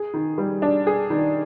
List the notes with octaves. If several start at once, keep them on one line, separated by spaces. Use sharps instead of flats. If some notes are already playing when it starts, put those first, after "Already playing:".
Already playing: G#4
D#3
G3
D4
G#4
D#3